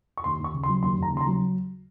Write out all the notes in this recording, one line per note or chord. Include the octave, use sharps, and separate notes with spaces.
C#6
D#2 C6
D#2 C#6
C#3
C6
F#3
D#2 C6
D#2 A#5
C#3
C6
A#5
F#3